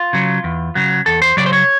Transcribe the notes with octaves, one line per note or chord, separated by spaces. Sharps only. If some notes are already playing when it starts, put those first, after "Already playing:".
Already playing: F4
C#3 F#3
E2
C#3 F#3
E2 A4
C5
C#3 F#3 D5
C5
C#5